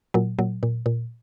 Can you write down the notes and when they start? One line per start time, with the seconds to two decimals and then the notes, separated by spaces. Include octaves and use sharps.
0.14 A#2 F#3
0.39 A#2 F#3
0.63 A#2
0.86 A#2